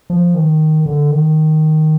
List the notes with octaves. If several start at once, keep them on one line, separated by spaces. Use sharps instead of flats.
F3
D#3
D3
D#3